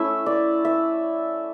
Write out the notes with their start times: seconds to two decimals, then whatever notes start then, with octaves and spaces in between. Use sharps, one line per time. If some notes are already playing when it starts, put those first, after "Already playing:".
Already playing: A3 C#4 E4 E5
0.26 D5
0.65 E5